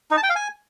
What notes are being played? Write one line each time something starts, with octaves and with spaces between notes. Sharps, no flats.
D#4
A5
G5
F5
G#5